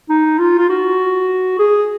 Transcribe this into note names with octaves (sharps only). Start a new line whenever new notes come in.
D#4
F4
F4
F#4
G#4